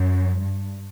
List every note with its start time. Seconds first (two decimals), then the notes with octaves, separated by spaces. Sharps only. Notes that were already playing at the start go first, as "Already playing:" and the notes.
Already playing: F#2
0.39 G2